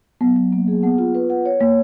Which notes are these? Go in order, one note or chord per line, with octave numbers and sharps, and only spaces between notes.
F#3 B3
F#3
A#3
G#4
B3 F#5
F4
B4
F#5
C#5
A#3 C#5